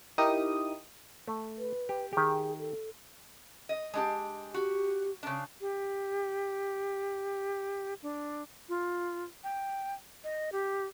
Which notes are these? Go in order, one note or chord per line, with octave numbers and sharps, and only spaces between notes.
D#4 E4 G4 A#4 D#6
A3
B4
G4
D#3 G4 G#4
A4
D#5
G#3 D4 G4
F#4 G4
C#3 D4
G4
D4
F4
G5
D#5
G4